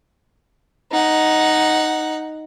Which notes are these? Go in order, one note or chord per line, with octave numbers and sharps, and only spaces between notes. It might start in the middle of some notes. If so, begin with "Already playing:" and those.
D#4 F#5